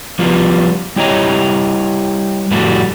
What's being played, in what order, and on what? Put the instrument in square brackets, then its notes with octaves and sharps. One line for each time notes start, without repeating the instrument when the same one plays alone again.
[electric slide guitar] F3 G3 B3 F4
G3 E4 G4 C#5 D#5 A#5
F2 A2 G3 A3 F#4